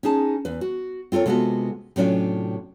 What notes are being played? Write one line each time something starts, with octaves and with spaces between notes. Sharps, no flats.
C#4 D#4 G#4 A5
E2 B4
F#4
C4 F4 A4 A#4 C#5
C3 G#3 B3 F4 F#4 A4
A2 C3 F#3 C#4 D4 F4